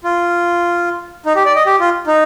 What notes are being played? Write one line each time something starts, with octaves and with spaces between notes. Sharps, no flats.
F4
D#4
G4
D5
D#5
G4
F4
D#4